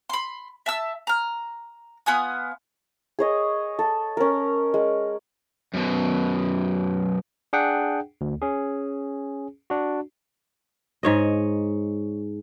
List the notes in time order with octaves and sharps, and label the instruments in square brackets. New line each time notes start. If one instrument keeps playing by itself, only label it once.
[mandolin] B5 C6
E5 A5 E6
A#5 F6
B3 F4 G#5 D#6
[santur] G#4 C#5 D#5
A4
C#4 A#4
G#3
[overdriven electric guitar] F#2 B2
[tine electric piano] D4 G#4 F#5 G5
D2
C#4 G#4
D4 F#4
[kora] G#2 C#5 D#5